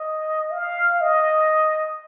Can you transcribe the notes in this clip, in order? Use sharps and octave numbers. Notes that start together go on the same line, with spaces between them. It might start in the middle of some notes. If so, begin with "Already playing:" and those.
Already playing: D#5
F5
D#5